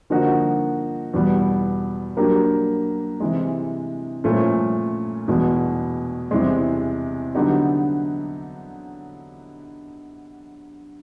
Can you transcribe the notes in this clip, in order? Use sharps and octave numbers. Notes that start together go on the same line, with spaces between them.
D3 F3 A#3 D#4 F#4
E2 B2 G3 B3
F#3 A#3 D4 G4 A#4
C3 E3 G#3
A#2 F3 A3 C#4 F4
E2 B2 G#3 B3
E2 C3 E3 G#3
D3 F#3 B3 D#4 G4